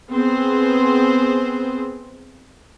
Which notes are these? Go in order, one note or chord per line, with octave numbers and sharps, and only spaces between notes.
B3 C4 G#4 C5